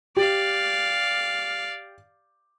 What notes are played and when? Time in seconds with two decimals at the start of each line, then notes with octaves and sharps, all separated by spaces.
0.17 G4 D5 F5